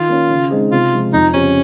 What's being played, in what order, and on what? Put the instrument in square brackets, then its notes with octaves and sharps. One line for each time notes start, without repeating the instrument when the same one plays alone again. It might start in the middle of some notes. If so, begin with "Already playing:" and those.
Already playing: [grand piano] D#3 [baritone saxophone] F4
[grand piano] A#3 C#4
C#3
G#3 C4 D#4 G#4
[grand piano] C3 [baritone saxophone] F4
[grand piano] F3 G#3
[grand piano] F2 [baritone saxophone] D#4
[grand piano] C#3 F3 C4 G4 [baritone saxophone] C#4